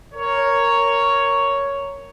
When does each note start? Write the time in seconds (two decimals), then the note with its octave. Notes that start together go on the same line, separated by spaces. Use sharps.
0.13 A#4 C#5